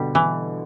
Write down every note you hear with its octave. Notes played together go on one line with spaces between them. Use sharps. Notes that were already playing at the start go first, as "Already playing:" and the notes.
Already playing: B2 D3 G3
E3